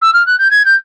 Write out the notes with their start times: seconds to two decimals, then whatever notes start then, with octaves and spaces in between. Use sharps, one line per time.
0.01 E6
0.13 F6
0.26 F#6
0.38 G6
0.50 G#6
0.65 G6